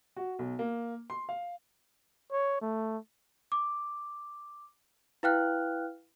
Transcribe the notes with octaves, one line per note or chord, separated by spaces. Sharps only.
F#4
B1
A#3
C6
F5
C#5
A3
D6
E4 B4 F5 G5 F6 F#6